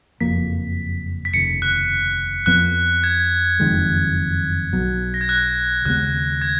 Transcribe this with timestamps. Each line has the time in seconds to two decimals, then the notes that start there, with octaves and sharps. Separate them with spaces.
0.21 F#1 F2 F3 A#3 B6
1.25 B6
1.34 F1 D#2 C#3 C#7
1.62 F#6
2.46 F2 F3 B3 F#6
3.04 G#6
3.60 F#1 F2 D#3 G#3
4.73 B1 B2 F#3
5.14 A#6
5.21 G#6
5.29 F#6
5.85 D#2 C#3 G#3 B3 F#6
6.41 G#6